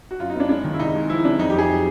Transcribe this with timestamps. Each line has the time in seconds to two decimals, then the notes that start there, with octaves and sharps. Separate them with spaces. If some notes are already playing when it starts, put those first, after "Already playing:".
0.11 F#4
0.20 F#2 F4
0.30 D#4
0.35 B3 D4
0.49 G#3 D4
0.64 D#3
0.74 E4
0.79 C2 D#4
0.95 G#3
1.10 F3 E4
1.24 C3 D4
1.39 F2 D#4
1.50 G4
1.54 F2 G#4
1.70 F#3